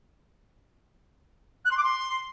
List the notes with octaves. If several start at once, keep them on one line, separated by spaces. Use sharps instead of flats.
F#6
C6
D6
C6